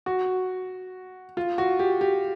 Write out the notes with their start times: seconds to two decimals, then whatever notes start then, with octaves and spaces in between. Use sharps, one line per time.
0.06 F#4
1.37 F4
1.58 F#4
1.79 G4
2.01 G4